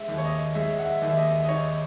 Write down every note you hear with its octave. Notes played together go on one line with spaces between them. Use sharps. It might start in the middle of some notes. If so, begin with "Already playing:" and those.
Already playing: G#3 E5
D#2
C#5
D#5
G#3 E5
F#5
E5
D#2
E5
D#5
D#5
D#4 C#5